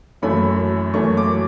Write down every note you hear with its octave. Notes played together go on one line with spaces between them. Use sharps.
F#2 E3 A3 C#4 B5
F#2 E3 A3 C#4 C#6
D6